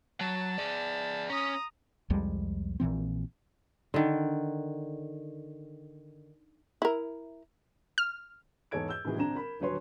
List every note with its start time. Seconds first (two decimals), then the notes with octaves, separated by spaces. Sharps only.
0.21 F#3 A5
0.58 G#4 D5
1.30 C#4 A#5 D#6
2.10 C2 F2 G3 G#3
2.80 A#1 A#2 E3 C4
3.94 D3 D#3
6.82 E4 A#4
7.98 F6
8.71 E2 G#2 A4 C#5 G#6 D7
8.89 E6 G6
9.05 A2 C3 D#3 E3 F#4 G#4
9.17 A#1 D3 C4 D4 A#5 E7
9.35 A#4 B5
9.60 D#1 D3 F#3 B4 C#5 C6